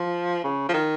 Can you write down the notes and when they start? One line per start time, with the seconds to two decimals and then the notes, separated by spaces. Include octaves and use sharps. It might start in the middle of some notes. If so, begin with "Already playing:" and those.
Already playing: F3
0.44 C#3
0.69 F3
0.74 D#3